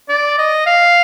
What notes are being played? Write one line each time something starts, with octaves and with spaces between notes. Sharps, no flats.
D5
D#5
F5